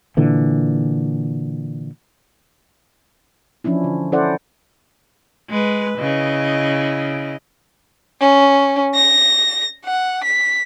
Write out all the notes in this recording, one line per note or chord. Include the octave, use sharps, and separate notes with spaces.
A#2 D3 E3
E3 F3 C#4 D4 E4
D3
C#4 E4 A4 C5 D5 F#5
G#3 B4
C#3 E4 D#5
C#4
A#6
F#5
B6